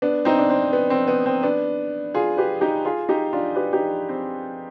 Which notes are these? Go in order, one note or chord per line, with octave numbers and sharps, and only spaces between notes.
B3 D4
C4 D#4
D4
C4
B3
C4
B3
C4
B3 D4
F4 G#4
G4 B4
D#4 G4
F4 G#4
D#4 G4
D4 F4
G4 B4
D#4 G4
C4